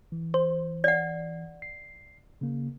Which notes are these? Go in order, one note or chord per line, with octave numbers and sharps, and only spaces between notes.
E3
C5
D5 F#5
C7
C#3 A#3